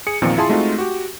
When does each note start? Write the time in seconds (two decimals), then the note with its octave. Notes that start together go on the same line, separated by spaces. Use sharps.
0.07 G#4 C#7
0.22 E2 A#2 D#3 F3 C4
0.37 E4 F4 G#4 A5 C6
0.49 G#3 A3 C4 D#4 F4 F#4
0.78 F#4 G4